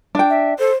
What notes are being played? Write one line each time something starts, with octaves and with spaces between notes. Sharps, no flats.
D4 G5
E5
A4 C5